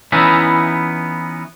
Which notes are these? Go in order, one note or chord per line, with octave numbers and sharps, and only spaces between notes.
E3 B3 C#4 D#4 E4 E5